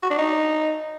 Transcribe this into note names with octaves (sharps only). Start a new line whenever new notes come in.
F#4
D4
D#4